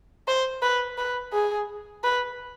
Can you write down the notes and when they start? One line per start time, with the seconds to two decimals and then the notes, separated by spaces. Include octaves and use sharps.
0.28 C5
0.62 B4
0.98 B4
1.33 G#4
2.04 B4